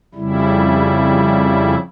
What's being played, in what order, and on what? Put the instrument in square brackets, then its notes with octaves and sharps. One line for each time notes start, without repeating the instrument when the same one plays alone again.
[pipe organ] F2 C#3 G3 E4